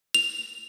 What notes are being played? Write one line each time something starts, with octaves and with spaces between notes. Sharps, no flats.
F7